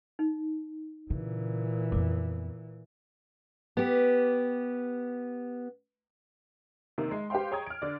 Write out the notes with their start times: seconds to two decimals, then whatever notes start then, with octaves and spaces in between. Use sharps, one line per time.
0.19 D#4
1.10 A#2 C#3 E3
1.92 F2 B3 D6
3.77 B3 G4
6.98 C3 D#3 A#3
7.11 G#3
7.30 G4 B4 C5 F5 G5 C6
7.51 G#4 C#5 G5 A#5 D#6 G#6
7.67 F6 D7
7.82 D3 D5